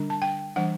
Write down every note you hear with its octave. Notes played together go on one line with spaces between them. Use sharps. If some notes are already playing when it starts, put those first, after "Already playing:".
Already playing: D3 G3 D4
A5
G5
E3 G3 D4 F#5